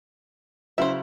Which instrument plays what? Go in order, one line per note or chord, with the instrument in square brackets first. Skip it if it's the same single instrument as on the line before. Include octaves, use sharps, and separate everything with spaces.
[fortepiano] C#3 F#3 E4 [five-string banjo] C5 E5